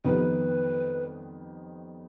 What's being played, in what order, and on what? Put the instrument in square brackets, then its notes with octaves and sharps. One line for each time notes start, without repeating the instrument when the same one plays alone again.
[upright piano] F2 D#3 G3 B3 [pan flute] B4